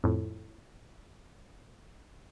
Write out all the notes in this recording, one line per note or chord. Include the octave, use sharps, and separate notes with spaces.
F2 A2